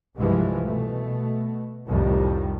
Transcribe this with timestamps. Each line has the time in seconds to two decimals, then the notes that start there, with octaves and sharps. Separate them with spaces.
0.16 C2 G2 E3 F3 G#3
0.64 B2 A3
1.88 C2 F2 A2 D#3 G3